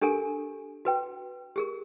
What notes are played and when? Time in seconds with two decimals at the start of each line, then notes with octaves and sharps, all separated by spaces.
0.01 D4 G4 A4 A#4 G#5
0.85 F#4 B4 G5
1.56 G4 G#4 A#4